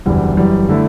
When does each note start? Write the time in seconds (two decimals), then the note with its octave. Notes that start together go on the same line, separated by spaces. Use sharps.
0.06 F#1 E2 D3 G3
0.37 F#2 E3 G3
0.69 D3 A3 E4